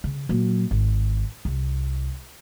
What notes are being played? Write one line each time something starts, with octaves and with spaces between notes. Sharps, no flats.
C#3
A#2 F#3
G#1
C2